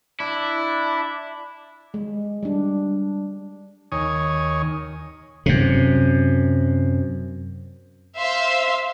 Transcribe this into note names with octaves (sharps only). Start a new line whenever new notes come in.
D4 E4
G#3
G3 D4
D#2 D#3 C#5 G#5 D#6
F#2 C3
C5 E5 F5 C6